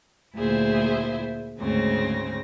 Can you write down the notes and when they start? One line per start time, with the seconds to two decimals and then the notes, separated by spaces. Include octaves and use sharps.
0.35 D2 A#2 E4 G#4 C5 E5
1.59 D2 G#2 C#3 C4 A#6